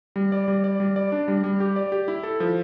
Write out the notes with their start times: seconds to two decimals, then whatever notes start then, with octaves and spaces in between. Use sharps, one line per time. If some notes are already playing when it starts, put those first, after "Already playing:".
0.16 G3
0.32 D5
0.48 G3
0.64 D5
0.80 G3
0.96 D5
1.12 D4
1.28 G3
1.44 G3
1.60 G4
1.76 D5
1.92 G4
2.08 E4
2.23 A4
2.40 F3